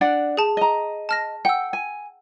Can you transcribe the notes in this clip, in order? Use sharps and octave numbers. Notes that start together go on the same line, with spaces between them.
D4 D5 F#5
G#4 A5
D#5 A#5
A5 F6 A#6
F#5 G5 E6
G#5